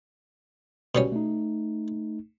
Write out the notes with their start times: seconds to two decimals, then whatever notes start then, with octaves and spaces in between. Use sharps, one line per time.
0.95 B2 G3 C#4
1.12 A3 D#4